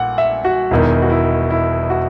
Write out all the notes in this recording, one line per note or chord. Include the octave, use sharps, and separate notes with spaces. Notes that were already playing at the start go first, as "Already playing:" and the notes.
Already playing: A#1 A#2 F#5
E5
F#4
E1 E2 D#3 E4
F#4
E4
E4
F#4